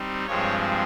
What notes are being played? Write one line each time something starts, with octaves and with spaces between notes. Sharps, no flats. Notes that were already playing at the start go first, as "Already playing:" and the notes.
Already playing: G3 C4 D#4
G2 F3 G#3 C4 C#5